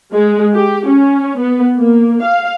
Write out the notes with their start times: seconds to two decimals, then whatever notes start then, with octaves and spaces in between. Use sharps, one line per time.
0.13 G#3
0.53 G4
0.88 C#4
1.38 B3
1.77 A#3
2.22 F5